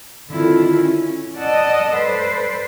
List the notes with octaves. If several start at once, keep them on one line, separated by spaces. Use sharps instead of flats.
D3 D#3 C4 E4 F4 A4
C#4
D5 D#5 F#5 A5 E6
A4 B4 C5 D5